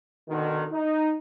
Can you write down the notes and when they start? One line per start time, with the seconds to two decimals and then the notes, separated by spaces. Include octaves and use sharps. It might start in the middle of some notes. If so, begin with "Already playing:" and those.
0.29 B2 D3 D#3
0.72 D#4